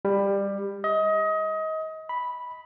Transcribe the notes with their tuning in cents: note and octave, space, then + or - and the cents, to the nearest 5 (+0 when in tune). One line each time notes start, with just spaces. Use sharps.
G3 +20
D#5 +25
B5 -5